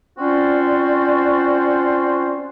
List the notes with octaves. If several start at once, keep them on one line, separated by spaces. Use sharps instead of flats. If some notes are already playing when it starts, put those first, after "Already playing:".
C4 C#4 F4 F#4 C5 D5